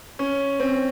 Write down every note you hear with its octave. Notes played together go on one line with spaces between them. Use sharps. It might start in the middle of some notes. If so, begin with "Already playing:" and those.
C#4
C4